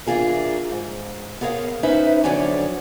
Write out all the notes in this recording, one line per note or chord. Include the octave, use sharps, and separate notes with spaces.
E3 D4 D#4 F4 G#4 A#4
G#2
B3 G#4 A#4 C#5 F5
C#4 D#4 E4 B4 C5 E5
F2 D3 F#3 C#5 D5 G#5